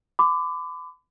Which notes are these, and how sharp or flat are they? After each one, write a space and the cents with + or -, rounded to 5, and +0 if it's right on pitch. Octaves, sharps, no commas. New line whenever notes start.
B5 +40 D6 +0